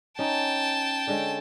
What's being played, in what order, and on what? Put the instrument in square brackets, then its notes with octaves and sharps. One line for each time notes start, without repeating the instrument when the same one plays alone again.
[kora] C#4 D#4 [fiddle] G5 A5
[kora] D3 G#3 C#4